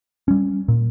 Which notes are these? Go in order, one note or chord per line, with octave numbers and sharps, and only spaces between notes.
G3 C#4
A#2